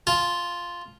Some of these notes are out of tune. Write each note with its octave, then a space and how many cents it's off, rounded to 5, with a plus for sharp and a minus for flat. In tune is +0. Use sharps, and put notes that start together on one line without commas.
F4 +0 A5 -30